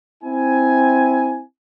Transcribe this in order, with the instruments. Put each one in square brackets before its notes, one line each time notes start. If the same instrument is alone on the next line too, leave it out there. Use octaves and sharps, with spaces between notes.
[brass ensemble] C4 E4 G#5